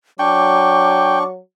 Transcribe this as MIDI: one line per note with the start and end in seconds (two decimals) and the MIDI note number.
0.19 1.40 54
0.19 1.23 62
0.19 1.19 79
0.19 1.23 85
0.19 1.26 86